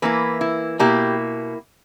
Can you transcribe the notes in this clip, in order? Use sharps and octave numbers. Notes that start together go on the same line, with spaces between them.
E3 A#3 E4 B4
E4
B2 A#3 E4 G4